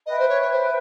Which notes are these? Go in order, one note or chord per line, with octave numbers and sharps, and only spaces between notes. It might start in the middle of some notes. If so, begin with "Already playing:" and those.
B4 D#5 E5 G5
C5
C#5
C#5
C5